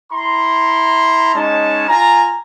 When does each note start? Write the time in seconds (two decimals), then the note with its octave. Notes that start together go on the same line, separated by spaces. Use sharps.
0.13 E4 A#5 C6
1.35 G#3 C#4 D#4 C#5 A5
1.88 F4 G#5 A#5